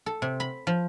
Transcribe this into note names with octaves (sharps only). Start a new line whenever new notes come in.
A4
C3
B5
F3